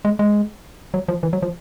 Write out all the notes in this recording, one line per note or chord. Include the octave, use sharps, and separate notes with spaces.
G#3
G#3
F#3
F3
E3
F#3
F3